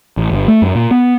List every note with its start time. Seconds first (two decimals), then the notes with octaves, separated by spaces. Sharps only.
0.17 A1
0.31 G1
0.48 A3
0.62 F#2
0.75 A#2
0.91 B3